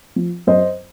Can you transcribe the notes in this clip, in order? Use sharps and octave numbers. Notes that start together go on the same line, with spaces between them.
F3
F#2 C5 D#5